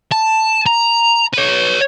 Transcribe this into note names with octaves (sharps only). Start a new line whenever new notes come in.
A5
A#5
B4 C#5